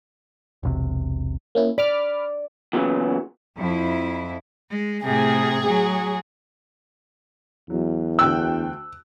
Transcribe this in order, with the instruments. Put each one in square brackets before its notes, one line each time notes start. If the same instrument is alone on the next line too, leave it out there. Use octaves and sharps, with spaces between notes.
[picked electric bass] E1 B1 C3
[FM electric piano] A#3 C#4 E4
[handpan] D5 [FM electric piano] B5 D6 F6
[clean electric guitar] E2 A#2 C#3 E3 F#3
[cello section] F2 E4
[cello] G#3
[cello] A2 C3 [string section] G#4
[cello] F#3
[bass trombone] E2 [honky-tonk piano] F#3
[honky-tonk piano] D2 G5 F#6 [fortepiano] E6